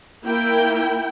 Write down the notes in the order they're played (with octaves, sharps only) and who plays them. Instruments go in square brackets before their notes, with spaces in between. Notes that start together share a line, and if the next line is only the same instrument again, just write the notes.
[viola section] A#3 E4 G5